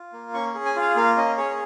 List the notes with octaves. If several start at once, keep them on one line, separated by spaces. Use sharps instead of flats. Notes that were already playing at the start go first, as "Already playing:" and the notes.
Already playing: F4
A#3
C#4 C#6
G#4
G#5
F4 F5
A#3 F5
C#4 D#5
G#4 C#5